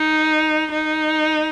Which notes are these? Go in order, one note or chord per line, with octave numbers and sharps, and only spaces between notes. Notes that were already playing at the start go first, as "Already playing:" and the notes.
Already playing: D#4
D#4